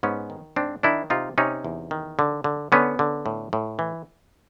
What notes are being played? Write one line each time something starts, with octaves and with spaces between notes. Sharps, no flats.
G#2 B3 C#4
D#3
G#2 C4 D4
D#3 D4 E4
C3 D#4 F4
C3 C#4 D#4
E2
D#3
D3
D3
D3 B3 C#4
D3
A2
A2
E3